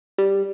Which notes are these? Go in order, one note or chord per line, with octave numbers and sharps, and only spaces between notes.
G3